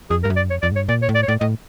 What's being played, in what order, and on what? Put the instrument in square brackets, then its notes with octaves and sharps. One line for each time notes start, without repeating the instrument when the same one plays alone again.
[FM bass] F2 [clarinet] G#4
[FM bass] G2 [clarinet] A#4
[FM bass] F#2
[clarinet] D5
[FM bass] F2 [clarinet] C#5
[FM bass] F2 [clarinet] D5
[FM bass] G#2
[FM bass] G2 [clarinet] C#5
[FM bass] A#2 [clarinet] D5
[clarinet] C#5
[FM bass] A2
[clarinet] D5
C#5
[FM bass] A2 [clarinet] D5
[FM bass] A2 [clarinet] D#5